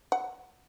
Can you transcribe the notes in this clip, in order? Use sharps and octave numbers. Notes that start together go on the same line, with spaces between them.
F#5